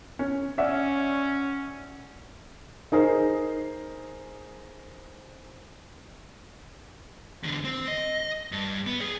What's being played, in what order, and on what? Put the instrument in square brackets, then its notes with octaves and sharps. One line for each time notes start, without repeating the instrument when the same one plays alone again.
[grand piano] C#4
[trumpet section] C#4 [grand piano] D5 E5 F#5
[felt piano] D#4 G#4 A#4 C5
[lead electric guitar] E2 D3
C4
D#5
G2
B3
G#4 G5